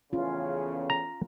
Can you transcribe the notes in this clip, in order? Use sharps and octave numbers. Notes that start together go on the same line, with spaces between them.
E2 A2 C#3 C#4 F4
A#5